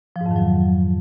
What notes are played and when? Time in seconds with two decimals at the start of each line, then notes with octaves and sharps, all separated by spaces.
0.16 F3
0.21 G#2
0.26 F2
0.31 D#3
0.36 F#3